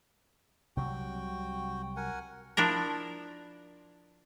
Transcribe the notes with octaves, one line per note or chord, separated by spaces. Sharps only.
C2 C3 F#3 F#4 G5
A#4 F#5 G#5
F3 D4 E4 A#4